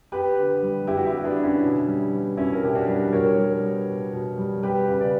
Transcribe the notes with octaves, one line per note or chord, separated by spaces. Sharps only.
B3 G4 B4
D3
G3
G2 E4 G4
F#4
E4 G4
B3
B3 D4
D3
C#4 E4
B2
G3
B3
B2 C#4 E4
A#4
B2 G4
D4 F#4
G3
B2 A#4 C#5
G3
B3
B2
B2
G3
B3 G4 B4
C#3
B4 D5